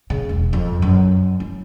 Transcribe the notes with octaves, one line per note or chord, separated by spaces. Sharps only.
C#3
E1
F2
F#2
E4